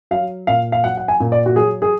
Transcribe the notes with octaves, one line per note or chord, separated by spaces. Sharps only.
F#3 F5
A#2 F5
F5
F#3 F#5
F#5
G#5
A#2
D5
F#4
F#3 G#4
G#4